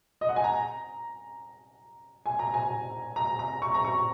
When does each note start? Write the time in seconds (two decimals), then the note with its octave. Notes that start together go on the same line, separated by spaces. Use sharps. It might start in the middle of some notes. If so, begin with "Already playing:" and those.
0.21 D#5
0.29 F#5
0.36 G#5
0.44 A#5
2.26 G#5
2.39 A#5
2.54 G#5
3.16 A#5
3.39 A#5
3.62 C#6
3.74 A#5
3.84 C#6